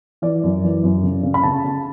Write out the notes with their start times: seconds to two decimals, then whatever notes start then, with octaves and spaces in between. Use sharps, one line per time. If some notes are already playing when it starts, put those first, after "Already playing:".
0.22 E3 D5
0.43 F#2
0.64 E3
0.84 F#2
1.03 C#3
1.23 C#3
1.34 B5
1.43 C#3 A5
1.64 C#3